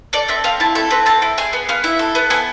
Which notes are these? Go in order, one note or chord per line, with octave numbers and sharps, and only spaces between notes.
A4 D5
C4 E5
C4 F5
E4 A5
A4 E5
C4 B4
C4 A5
E4
G#4 G#5
B3
B3 F5
E4 E5
A4
B3
B3 G#5